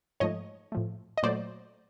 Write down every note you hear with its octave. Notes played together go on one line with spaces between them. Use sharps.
G#2 F3 A3 C#5 D#5
A2 F3 A3
D#5
A#2 F#3 A3 C5 D5